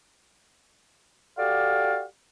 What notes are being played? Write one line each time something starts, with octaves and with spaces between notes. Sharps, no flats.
F#4 G4 A4 D5 F5